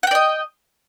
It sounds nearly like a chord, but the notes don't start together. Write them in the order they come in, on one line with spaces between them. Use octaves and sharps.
F#5 G5 D5 D#5